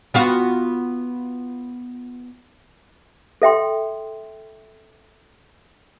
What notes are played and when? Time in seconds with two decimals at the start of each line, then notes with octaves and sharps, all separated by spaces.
0.14 B3 F4 F#4
3.42 A4 E5 G5 C6